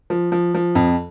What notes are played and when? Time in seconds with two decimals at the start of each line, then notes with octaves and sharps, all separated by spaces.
0.10 F3
0.32 F3
0.54 F3
0.75 F2